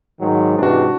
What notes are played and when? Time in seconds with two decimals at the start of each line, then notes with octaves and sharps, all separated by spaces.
0.20 G#2 D#3 F#3
0.59 G#2 C3 E3 D4 F#4